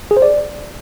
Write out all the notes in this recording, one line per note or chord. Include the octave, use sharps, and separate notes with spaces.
G#4
C5
D5